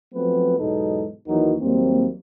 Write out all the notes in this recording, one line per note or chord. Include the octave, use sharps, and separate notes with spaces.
F3 F#3 A3 B3 C4 B4
E2 G#2 B2 F#3 D#4 A4
D#2 E3 F#3 D#4 F#4 A#4
D#2 F#3 G3 A#3 C4